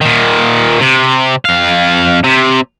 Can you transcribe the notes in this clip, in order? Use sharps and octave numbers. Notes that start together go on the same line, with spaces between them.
A#2 D#3
C3
F2 F5
C3